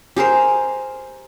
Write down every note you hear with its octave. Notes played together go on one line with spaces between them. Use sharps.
G4 G#4 A#4 C5